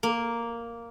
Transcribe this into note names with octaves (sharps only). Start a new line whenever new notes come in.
A#3